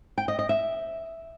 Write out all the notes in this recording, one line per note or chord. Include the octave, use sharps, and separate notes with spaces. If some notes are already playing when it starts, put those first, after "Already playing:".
G5
D#5
D#5
E5